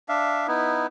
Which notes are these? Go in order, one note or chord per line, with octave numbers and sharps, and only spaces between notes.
D4 E5 F5
B3 D#4 E4